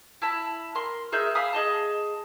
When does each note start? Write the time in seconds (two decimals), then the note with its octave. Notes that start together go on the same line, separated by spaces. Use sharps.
0.22 E4 A5 B5
0.75 A#4 C6
1.12 G#4 A#4 E5 G6
1.35 F5 G#5 B5 D#6
1.53 G#4 D#5 A5